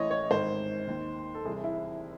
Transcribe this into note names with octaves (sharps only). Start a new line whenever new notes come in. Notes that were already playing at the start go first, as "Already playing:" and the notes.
Already playing: A1 A2 E3 C#5 D#5
C#5
G#1 G#2 D#3 C5
D#2 D#3
A4
C2 C3 E3 G#4
E4